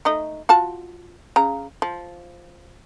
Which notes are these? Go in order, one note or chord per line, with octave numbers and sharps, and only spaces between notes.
A3 D#4 D#5
F4 F#4 A5
C#3 A#5
F3